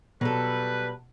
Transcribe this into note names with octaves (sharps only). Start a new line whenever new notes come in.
B2 F#3 G3 A4 B4